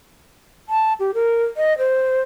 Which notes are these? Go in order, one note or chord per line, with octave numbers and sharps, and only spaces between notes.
A5
G4
A#4
D#5
C5